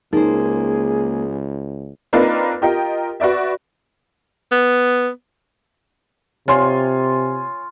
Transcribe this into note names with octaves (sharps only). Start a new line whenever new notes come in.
C#2 A#3 D#4 G#4 C5
A#3 C4 D4 D#4 F4 B4
F4 G4 A#4 D#5 G5
F#4 B4 D5 E5
B3
C3 F4 C#5 G#5 C6